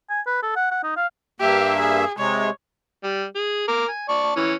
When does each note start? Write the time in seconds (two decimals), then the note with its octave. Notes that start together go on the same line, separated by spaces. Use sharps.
0.10 G#5
0.27 B4
0.43 A4
0.56 F#5
0.71 F#5
0.83 D#4
0.96 F5
1.40 G2 A#3 G4 E5
1.80 G#4
2.18 C3 G#3 C#5
3.04 G3
3.35 G#4
3.68 A#4 D6
3.88 G#5
4.09 D5 A5 C#6
4.36 E3 C#4